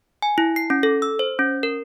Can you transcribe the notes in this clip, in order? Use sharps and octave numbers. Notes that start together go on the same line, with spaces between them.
G#5
E4
C7
C#4
A4
E6
C5
C#4
A#4